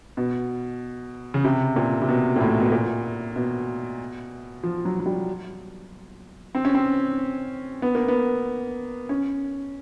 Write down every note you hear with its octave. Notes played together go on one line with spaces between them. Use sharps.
B2
C#3
C3
A#2
C3
B2
A#2
A2
B2
A#2
B2
F3
F#3
F#3
G3
C4
C#4
C4
B3
A#3
B3
C#4